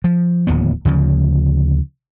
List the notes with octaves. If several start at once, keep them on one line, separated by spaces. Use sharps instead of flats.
F3
D1 D#2 F3 B3
D2 C#3 F3